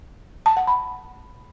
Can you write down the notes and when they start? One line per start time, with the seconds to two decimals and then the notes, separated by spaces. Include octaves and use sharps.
0.46 A5
0.57 F#5
0.67 B5